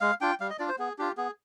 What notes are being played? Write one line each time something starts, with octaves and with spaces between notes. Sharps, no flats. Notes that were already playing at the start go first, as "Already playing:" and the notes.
G#3 F5
D4 F4 G5
G3 F5
D#5
D4 F4 D5
C5
B3 G#4
D4 F4 G4
B3 G#4